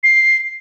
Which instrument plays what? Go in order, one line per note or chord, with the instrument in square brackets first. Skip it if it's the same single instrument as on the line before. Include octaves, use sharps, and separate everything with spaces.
[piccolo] C7